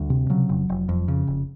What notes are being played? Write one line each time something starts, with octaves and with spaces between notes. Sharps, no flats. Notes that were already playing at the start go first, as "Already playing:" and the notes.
Already playing: D2 G3
C3
C#3 F#3
F1
F1
F2
C#3
F1